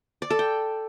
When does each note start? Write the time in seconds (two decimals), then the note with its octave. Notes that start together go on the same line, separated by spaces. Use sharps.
0.22 D5
0.30 A4
0.39 G5